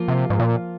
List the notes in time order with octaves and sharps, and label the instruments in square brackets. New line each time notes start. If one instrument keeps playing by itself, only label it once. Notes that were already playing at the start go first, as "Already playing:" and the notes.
Already playing: [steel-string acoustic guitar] F3 A#3 F4
[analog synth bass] C3
G#2
A#2